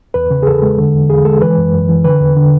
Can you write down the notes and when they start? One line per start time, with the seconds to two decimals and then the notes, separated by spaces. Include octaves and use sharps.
0.14 E2 B4
0.31 C#3
0.43 G#4
0.47 E2 A4
0.62 G#3
0.78 D3
0.94 E2
1.10 E2 G#4
1.25 G#3 A4
1.42 E3 B4
1.58 F#2
1.73 F#2
1.89 E3
2.04 D3 B4
2.20 E2
2.36 D3